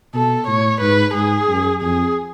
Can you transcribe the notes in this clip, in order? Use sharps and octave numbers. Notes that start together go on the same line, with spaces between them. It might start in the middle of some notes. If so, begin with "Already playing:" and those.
B2 A4
A2 C#5
G#2 B4
G#2 G#4
F#2
F2 G#4